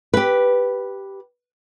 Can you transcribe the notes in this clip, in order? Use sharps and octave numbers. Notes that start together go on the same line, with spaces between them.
G4 B4